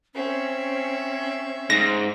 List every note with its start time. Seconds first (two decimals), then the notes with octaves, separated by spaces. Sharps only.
0.15 C4 C#4 E5
1.70 G#2 A#6